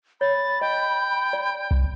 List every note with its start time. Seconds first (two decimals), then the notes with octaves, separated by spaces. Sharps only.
0.21 C#5 B5 A6
0.61 D#5 G5
1.33 D5
1.71 C2